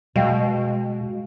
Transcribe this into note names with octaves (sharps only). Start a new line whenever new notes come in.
B2 G#3 F5 G5